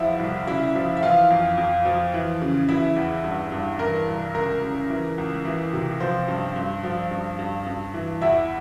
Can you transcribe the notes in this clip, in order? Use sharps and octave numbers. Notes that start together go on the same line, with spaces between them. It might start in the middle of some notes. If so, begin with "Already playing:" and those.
Already playing: E2 F3 E4 E5
C2
C#3 E4 E5
F3
E5
E3 F4 F5
F2
F2
F3
E3
C#3
E3 E4 E5
E2
G2
G2
E3 A#4
C2
C#2 A#4
C#3
E3
C#2
E3
C3
F3 C5
G2
G2
F3
G2
G2
G2
E3
E2 E4 E5